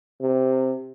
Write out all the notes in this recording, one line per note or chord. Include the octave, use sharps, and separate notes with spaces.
C3